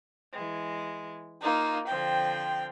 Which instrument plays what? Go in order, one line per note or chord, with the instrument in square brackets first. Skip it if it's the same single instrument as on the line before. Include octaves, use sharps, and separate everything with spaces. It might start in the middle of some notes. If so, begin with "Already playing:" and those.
[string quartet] E3 G#3
[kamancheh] A#3 D#4 [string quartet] F4
[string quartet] D3 F3 C4 [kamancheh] G5